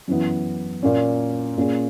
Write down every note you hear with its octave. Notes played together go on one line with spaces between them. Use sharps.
F#2 E3 B3 E4
A#2 A#3 C#4
A#2 A#3 C#4 G#4